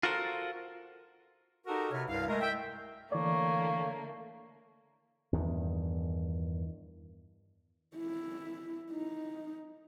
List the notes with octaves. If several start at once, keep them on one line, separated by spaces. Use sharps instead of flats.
F4 F#4 A4 A#4 C5
D#4 F#4 G4 A4 A#4
C3 B4 C#5 F6
C2 G2 F5
G#3 A3 A#4
E5 G5
D3 E3 A3 A#3 C#5 D5
E2 G2 D#3
E4
D#4